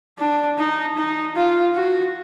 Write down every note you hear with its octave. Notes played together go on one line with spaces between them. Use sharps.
D4
D#4
D#4
F4
F#4